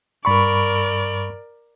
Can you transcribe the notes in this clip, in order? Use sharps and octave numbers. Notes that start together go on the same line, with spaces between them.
G2 A#4 D5 B5 C#6